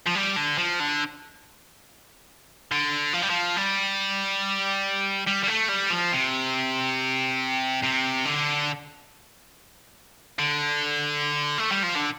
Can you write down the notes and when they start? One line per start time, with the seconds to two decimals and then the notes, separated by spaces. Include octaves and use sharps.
0.06 F3
0.15 G3
0.36 D3
0.58 F3
0.80 D3
2.72 D3
3.13 F3
3.22 G3
3.30 F3
3.57 G3
5.27 G3
5.44 G3
5.48 A3
5.69 G3
5.90 F3
6.12 C3
7.83 C3
8.25 D3
10.39 D3
11.58 A3
11.72 G3
11.84 F3
11.96 D3